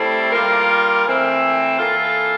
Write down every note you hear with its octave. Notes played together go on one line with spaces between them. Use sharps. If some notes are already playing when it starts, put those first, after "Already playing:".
Already playing: A2 G3 C4 E4 A4
G3 A#3 F4 A#4
E3 A3 C4
E3 A#3 F4 A4